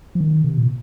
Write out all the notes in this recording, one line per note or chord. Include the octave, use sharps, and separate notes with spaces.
F3
D#3
C3
A#2